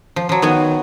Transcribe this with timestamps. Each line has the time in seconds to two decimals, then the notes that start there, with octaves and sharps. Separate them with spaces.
0.16 F3
0.29 F3 F#3
0.42 D#3 B3 F#4 G#5